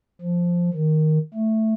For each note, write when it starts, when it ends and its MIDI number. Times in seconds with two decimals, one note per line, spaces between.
0.21 0.69 53
0.74 1.19 51
1.34 1.74 57